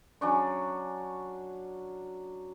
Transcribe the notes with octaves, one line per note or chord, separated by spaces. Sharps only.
F#3 C#4 D4 C#6